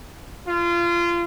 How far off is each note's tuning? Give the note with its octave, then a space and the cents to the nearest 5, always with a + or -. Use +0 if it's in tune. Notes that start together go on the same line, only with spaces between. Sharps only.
F4 -25